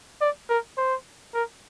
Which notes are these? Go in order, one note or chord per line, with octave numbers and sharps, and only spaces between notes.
D5
A#4
C5
A#4